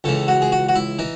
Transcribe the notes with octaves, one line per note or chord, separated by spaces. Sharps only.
C#2 C#3 E3 A4
F#4
G#4
F#4
F#4
E4
E3 D#4